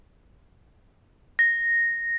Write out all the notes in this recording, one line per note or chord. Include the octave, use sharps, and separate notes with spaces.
A#6